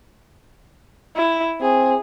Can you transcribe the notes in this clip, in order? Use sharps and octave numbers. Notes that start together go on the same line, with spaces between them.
E4
C4 G#4